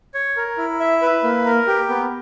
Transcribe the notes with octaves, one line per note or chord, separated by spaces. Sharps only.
C#5
A#4
E4
E5
B4
A#3
A#4
G4
B3